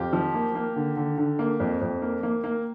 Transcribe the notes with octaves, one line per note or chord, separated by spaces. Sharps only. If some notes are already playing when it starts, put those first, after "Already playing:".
Already playing: F2 F4 G4
F3
A#3
A#3
D3
D3
D3
A#3
F2
F2
A#3
A#3
A#3